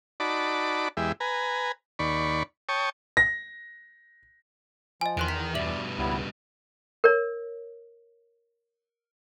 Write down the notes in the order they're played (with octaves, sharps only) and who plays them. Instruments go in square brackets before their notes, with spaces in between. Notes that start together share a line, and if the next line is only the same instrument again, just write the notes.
[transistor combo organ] D#4 F#4 D5 A5 B5 D6
E2 G#3 G4 E5
B4 G#5 A#5
D#2 D5 B5 C#6
C#5 G5 A5 C#6 D#6
[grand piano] A#6
[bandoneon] F3 [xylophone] D#5 G#5
[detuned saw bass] E2 [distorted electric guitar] D#3 [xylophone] C6 F#6 D7
[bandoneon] A#5 [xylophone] B6
[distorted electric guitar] G2 B2 [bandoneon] D5 [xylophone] E5 F#7
[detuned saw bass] C#2 [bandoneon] G3 B3 E4
[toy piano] A#4 C#5